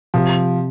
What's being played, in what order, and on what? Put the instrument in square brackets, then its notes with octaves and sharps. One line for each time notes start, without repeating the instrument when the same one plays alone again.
[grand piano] C3 [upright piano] F3